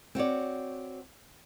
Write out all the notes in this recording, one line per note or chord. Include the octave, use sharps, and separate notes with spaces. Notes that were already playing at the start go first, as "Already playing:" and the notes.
C4 F#4 C#5 D5